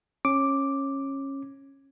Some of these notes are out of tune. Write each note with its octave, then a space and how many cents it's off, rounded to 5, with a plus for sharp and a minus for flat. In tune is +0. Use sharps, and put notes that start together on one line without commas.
C#4 -20 D6 +0